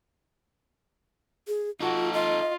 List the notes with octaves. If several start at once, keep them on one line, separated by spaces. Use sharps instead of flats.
G#4
D#4 F4 F#4 A4
F4 D#5